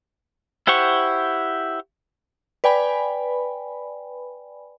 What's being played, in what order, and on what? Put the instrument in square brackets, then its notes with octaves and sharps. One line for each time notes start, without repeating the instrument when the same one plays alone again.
[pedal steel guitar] E4 G4 C5 F#5 C#6
[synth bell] B4 D5 G5 G#5 B5